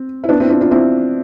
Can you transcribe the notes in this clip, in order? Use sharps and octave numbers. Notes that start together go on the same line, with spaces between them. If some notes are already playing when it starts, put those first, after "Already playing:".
Already playing: C4
E4
B3 D4
C4 E4
D4 F4
D4 F4
C4 E4